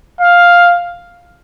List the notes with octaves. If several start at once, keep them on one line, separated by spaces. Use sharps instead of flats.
F5